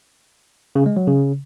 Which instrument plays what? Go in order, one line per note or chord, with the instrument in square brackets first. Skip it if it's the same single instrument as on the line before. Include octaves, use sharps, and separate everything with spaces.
[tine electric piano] C#3
G#3
F#3
C#3